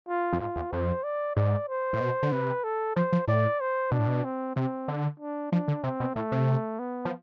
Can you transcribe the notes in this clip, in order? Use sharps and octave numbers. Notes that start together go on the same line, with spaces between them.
F4
F2
G#2 F4
E2
F2 C5
D5
G#2 D5
C5
A2
B2
D3
C3 B4
A4
F3 C5
F3
A2 D5
C5
B2 D4
A2
B2
C4
C3 C4
D3
D4
F3 D4
D3
C3 C4
B2
A2 A3
C3
B3
F3